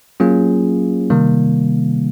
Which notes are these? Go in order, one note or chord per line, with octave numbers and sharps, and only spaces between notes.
F#3 A#3 C#4 F4 G#4
C3 D#3 G3 A#3